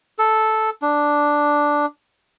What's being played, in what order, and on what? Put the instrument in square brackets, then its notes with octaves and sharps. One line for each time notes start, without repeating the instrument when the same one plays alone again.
[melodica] A4
D4